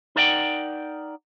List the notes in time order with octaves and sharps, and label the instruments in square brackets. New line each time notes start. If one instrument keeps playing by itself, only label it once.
[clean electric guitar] D#4 A#4 D5 E5 F#5 G5